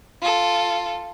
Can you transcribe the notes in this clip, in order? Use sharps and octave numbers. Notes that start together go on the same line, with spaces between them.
F4 A4